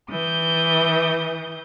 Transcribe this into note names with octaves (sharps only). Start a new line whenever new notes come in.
E3 D#6 G6